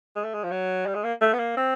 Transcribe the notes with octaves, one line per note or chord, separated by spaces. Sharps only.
G#3
A3
G#3
F3
F#3
G3
G#3
A#3
A3
B3
A#3
C4